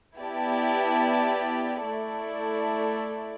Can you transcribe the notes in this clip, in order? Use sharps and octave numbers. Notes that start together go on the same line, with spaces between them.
B3 E4 G4 D5 A5
A3 E4 A4 D5